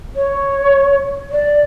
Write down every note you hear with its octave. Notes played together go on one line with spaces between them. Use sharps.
C#5
D5